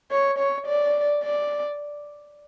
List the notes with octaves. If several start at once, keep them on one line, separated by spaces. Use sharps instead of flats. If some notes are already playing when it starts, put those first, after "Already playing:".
C#5
C#5
D5
D5